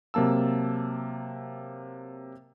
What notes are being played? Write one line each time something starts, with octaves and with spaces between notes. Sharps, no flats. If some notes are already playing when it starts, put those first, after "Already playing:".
C3 F#3 A#3 A5 E6